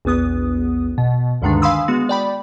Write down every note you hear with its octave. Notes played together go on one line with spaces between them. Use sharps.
A#1 E2 B3 D#6
B2
D2 G2 D3 D#3 G#3 D4
F5 G#5 B5 C6 D#6 E6
G#3 B3 F#4
D5 G5 B5